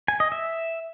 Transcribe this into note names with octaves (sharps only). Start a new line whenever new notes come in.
G#5
D#5
E5